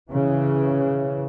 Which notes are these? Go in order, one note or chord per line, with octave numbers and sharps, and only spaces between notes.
C#3 E3